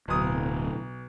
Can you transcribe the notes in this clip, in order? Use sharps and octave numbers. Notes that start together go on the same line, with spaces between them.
D1 B1 D#6